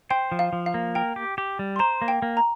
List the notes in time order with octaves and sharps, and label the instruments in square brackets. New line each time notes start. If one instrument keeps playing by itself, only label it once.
[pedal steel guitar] C5 [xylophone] G5
[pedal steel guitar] F3
[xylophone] F5
[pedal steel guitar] F3
[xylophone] F5
[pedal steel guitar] A#3
[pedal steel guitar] A#4 [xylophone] G5
[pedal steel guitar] G4
G4
G3
[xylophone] C6
[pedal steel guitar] C5 [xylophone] A#5
[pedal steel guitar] A#3
[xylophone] G5
[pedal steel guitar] A#3
[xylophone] A#5